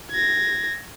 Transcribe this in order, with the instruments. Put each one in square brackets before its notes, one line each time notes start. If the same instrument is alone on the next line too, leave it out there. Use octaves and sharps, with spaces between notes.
[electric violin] G#6 A#6